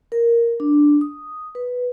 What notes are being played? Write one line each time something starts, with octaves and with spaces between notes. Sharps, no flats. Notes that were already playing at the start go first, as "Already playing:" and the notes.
A#4
D4
D#6
B4